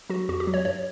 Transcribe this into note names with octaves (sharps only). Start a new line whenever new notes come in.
F#3 F#4
F2 F#4
G4
F#3
C#5
G2 C#5